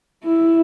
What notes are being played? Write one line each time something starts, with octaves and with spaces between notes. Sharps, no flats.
E4